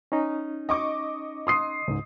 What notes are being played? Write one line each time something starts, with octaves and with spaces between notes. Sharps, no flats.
C#4 D#4
D#5 C#6 D6
C6 D#6 C7
C#2 G#2